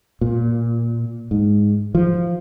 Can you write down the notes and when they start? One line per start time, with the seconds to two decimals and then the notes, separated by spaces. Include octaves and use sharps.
0.21 A#2
1.31 G#2
1.95 F3